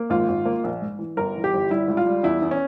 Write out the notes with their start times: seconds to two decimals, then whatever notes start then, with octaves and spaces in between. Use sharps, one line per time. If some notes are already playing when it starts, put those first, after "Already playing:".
Already playing: A#3
0.10 G#1 F4
0.28 G#1
0.45 A#3
0.64 A#1
0.82 G#2
0.99 E3
1.17 G1 A#4
1.36 E3
1.44 G4
1.53 G1
1.70 G3 E4
1.88 C#2
1.97 F4
2.07 G3
2.23 E2 E4
2.42 E2
2.51 C#4